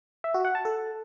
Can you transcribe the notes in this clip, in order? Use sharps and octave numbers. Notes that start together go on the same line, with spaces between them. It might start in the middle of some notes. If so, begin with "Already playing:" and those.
E5
F#4
F#5
A5
A4